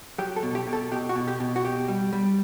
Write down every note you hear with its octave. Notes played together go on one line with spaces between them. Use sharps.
F#3 G4
A4
B2
G4
B2
A4
B2 G4
F#4
B2
G4
B2
F#4
B2 G4
G3
G3